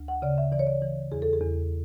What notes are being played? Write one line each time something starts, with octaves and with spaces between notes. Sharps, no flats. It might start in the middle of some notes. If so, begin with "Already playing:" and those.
Already playing: D2
F#5
C#3 D5
E5
E3 D5
C#5
D5
E3
E2 G#4
A4
G#4
E2